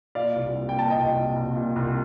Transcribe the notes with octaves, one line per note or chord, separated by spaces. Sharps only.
A#2 D5 F5
C2
C2
G5
A#2 A5
D#5 G5
C2
C2
C2
A#2
C2